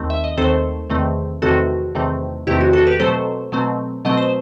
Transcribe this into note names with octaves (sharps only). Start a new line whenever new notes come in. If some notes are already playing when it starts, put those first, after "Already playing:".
Already playing: D#2 D#3 A3 C4
E5
D#5
D#2 D#3 A3 C4 A4 C5
E2 C3 D#3 A3 C4
E2 C3 D#3 A3 C4 F#4 A4
E2 C3 D#3 A3 C4
E2 C3 D#3 A3 C4 E4 G4
F#4
F#4 A4
G4 B4
B2 F#3 A3 C4 A4 C5
B2 F#3 A3 C4
B2 F#3 A3 C4 D#5
C5